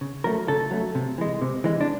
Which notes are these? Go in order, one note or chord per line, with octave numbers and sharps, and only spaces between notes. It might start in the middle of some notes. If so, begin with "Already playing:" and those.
C#3
F#3 A3 A#4
C#3 A4
F#3 A3
C3
E3 G#3
C3
E3 G#3
D4